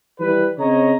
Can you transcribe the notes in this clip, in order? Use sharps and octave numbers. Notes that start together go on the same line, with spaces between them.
E3 G3 B4
C#3 C4 C#5 D#5 A#5